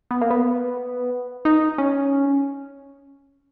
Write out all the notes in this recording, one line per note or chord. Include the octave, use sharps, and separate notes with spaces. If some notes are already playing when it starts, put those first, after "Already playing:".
B3
A#3
B3
D#4
C#4